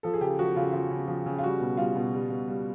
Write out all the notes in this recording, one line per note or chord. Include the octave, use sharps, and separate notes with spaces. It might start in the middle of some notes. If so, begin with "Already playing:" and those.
F3 A4
G#4
C#3 G4
F3 F#4
C#3 F4
F3 F4
C#3
F3
C#3
F4
G3 F#4
B2
G3 F4
B2
G3
B2
G3